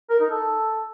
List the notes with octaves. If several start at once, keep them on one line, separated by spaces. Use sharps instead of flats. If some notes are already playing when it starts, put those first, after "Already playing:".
A#4
D#4
A4